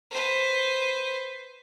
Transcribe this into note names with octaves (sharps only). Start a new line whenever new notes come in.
B4 C5